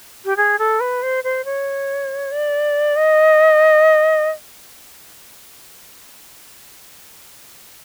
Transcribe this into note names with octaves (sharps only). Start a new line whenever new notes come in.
G4
G#4
A4
B4
C5
C5
C#5
D5
D#5